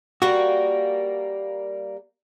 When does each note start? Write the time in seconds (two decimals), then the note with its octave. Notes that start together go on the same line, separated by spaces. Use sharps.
0.22 G3 A#3 F#4